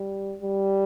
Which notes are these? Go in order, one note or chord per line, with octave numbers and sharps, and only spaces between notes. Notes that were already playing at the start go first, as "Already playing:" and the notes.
Already playing: G3
G3